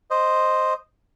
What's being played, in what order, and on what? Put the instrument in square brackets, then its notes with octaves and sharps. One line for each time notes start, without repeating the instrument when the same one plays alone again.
[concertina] C5 D#5